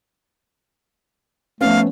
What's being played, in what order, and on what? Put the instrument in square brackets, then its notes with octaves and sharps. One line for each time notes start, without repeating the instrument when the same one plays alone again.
[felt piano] F3 B3 C#4 [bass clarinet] A3 [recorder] F5